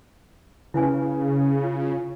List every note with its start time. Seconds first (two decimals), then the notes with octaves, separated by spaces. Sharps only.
0.74 C#3 E4 B4 G#5
1.64 F4